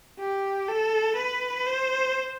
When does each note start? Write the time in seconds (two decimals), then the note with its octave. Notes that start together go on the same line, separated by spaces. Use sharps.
0.19 G4
0.68 A4
1.17 B4
1.66 C5